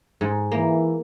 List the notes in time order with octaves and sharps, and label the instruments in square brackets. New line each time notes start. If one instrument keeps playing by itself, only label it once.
[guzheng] G#2
[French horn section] E3 [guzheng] A#3